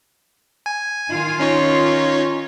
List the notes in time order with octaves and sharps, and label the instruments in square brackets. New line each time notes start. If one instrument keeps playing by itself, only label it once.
[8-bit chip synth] G#5
[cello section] D#3 F4
[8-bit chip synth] C#4 D#4 C#5